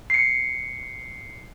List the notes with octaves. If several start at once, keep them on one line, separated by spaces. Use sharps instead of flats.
C7 C#7